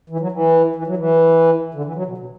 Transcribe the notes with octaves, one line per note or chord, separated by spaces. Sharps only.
E3
F#3
E3
E3
F#3
E3
D3
E3
F#3
B2
B2